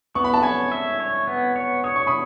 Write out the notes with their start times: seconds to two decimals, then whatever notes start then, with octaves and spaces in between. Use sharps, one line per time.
0.15 B3 C#6
0.24 B5
0.33 A5
0.42 C#5 G#5 B5
0.72 E5
1.00 C#5
1.27 B3
1.56 C#5
1.84 C#5 D#6
1.96 C#6
2.07 B5 D#6